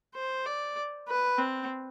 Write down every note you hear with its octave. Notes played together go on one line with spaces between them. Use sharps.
C5
D5
B4
C4